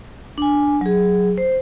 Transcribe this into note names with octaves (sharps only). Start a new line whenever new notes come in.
D4 G#5
F#3 G#4
C5